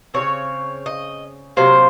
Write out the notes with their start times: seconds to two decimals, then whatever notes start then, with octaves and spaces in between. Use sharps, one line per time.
0.14 C#3 F#3 C4 C#5
0.86 D#5
1.57 C3 F#3 A#3 C5